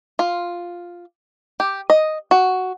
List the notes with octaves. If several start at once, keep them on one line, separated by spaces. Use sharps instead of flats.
F4
G4
D#5
F#4